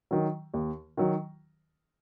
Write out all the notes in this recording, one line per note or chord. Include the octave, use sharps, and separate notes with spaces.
D#3 F#3
D#2
D#3 F#3